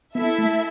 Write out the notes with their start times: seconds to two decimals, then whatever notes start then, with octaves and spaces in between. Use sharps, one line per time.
0.15 B3 E4 A4 E5
0.38 A3